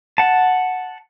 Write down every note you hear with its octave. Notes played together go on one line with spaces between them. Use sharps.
F#5 A5